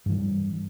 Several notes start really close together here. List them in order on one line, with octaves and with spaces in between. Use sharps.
G2 E3 G3